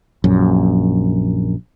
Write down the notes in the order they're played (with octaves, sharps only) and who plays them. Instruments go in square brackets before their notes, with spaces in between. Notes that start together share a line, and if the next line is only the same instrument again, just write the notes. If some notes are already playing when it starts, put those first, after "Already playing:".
[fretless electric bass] A#1 F#2